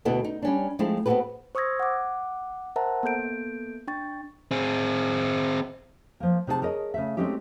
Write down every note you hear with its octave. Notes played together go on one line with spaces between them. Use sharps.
D2 B2 B3 E4 A4 D#5
D#4
G3 C#4 D4
F3 G#3 A3 C4 E4
B3 C4 F#4 G4 A4 B4
C5 C#6 D#6 E6 G#6 A#6
F#5 D6
A#4 C5 E5 F#5 A5 A#5
A#3 B3 A4 G6 D7
D4 G5 C#6 A6
C4 G#4
F3 A#3
C3 D#4 G#4 C#5 A5
G#4 A#4 C#5 D#5
C#3 A3 E5
G#3 A3 C4 C#4 D#4 G4